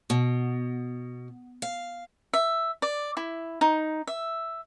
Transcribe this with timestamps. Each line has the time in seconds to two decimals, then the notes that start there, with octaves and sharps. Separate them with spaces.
0.10 B2
1.62 F5
2.34 E5
2.82 D5
3.17 E4
3.61 D#4
4.07 E5